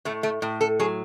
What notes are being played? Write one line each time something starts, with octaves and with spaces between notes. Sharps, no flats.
A2 A3
A3
A2
A4
F#3 G#4